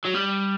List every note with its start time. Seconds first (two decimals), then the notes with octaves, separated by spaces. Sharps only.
0.05 F#3
0.15 G3